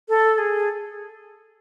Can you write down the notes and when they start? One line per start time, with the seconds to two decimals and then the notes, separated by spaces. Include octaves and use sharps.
0.09 A4
0.38 G#4